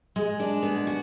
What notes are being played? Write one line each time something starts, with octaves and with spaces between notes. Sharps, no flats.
G#3
D4
B3
F#4